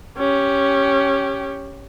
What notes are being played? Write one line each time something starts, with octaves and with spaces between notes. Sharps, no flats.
C#4 G4